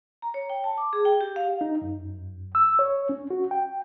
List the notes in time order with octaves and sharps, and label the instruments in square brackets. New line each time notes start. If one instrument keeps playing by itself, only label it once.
[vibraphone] A#5
C#5
G5
A5
D6
G#4
G5
G4
F5
[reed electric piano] D#4
F#2
E6
C#5
C#4
F#4
G5